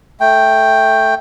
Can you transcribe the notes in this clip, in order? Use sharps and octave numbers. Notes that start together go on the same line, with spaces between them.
A3 G5